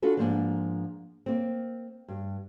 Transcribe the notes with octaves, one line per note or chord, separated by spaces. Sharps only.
D4 F4 F#4 A4 B4
G#2 C#3 F3 A#3 B3 D4
A#3 C4
G2